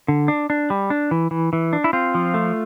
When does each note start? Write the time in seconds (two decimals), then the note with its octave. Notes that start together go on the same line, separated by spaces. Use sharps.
0.08 D3
0.28 D4
0.50 D4
0.70 G3
0.90 D4
1.11 E3
1.31 E3
1.53 E3
1.73 D4
1.84 E4
1.93 C4 F4
2.15 F3
2.34 A3